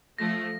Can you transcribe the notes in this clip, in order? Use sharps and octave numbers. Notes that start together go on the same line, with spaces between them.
F3 A3 A#6